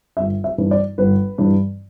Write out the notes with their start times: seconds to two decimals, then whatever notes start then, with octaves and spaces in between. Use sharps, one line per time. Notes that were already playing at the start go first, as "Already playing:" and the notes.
0.17 G1 E5
0.44 E5
0.58 G2 E3
0.71 D5
0.98 G1 B4
1.38 G2 E3